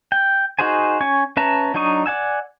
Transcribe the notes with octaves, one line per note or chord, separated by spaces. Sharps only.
G5
D#4 F#4 G#4 C5 G#5
C#4 G#5 C#6
C#4 B4 E5 A5 A#5
F#3 D4 D#4 C#6 D#6
D5 F#5 G#5 E6